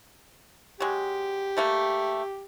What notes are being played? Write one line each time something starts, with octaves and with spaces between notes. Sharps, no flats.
F#3 G#3 G4
G3 A3 A#3